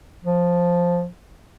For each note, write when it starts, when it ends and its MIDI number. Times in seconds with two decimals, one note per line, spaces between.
0.24 1.06 53